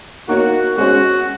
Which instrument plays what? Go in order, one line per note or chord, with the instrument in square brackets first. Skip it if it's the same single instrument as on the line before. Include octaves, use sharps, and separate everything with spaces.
[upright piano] A#3 D#4 A#4 C#5 [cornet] F#4
[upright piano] G#3 C#4 G#4 C5 [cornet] F#4